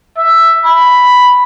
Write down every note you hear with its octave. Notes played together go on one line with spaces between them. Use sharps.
E5
B5